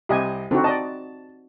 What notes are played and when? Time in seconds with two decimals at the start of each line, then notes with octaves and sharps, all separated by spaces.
0.09 C2 C3 G4 D#5 G#5
0.51 D3 C4 D#4 F#4
0.64 D5 D#5 A5